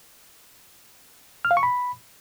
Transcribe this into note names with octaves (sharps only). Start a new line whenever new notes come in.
F6
F5
C#6
B5